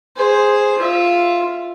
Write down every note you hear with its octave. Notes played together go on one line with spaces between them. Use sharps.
G#4 C5
F4 E5